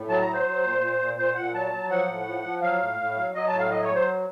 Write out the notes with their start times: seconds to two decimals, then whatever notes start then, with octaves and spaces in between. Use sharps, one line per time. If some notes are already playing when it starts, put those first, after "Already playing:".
Already playing: A2
0.09 F#3 A5
0.21 A#5
0.27 F#3
0.33 C5
0.45 F#3
0.63 A#2
0.81 A#2
0.99 A#2
1.17 A#2 C5
1.35 A#2 F#5
1.54 F#3 A5
1.72 F#3
1.90 F3 F#5
2.08 A2
2.26 F3
2.44 F3
2.62 F#3 F5
2.81 A2
2.99 A2
3.16 F#3
3.35 F#3 D#5
3.47 A5
3.53 A2
3.59 F5
3.71 F#3 D#5
3.83 C#5
3.89 F#3
3.95 C5